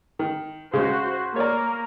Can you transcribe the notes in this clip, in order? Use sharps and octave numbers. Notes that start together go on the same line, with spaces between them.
D#3
C#3 G#3 F#4 C5
A#3 A#4 C#5 D5